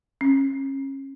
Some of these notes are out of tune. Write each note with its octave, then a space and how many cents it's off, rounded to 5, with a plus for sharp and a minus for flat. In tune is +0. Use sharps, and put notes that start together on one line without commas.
C#4 -30